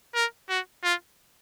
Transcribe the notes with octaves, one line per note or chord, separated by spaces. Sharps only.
A#4
F#4
F4